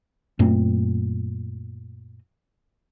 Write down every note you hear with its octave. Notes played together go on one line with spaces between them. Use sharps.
F#2 A#2 A3 C4